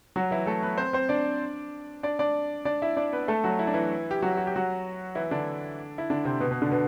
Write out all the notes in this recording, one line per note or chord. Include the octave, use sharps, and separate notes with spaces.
F#3 F#4
E3 E4
A3 A4
B3 B4
C4 C5
C4 C5
D4 D5
D4 D5
D4 D5
D4 D5
E4 E5
D4 D5
B3 B4
A3 A4
F#3 F#4
E4
D4
E3 E4
G4
F#3 F#4
F#4
G4
F#3 F#4
E3 E4
D3 D4
E4
D3 D4
C3 C4
B2 B3
B2 B3
D3 D4
B2 B3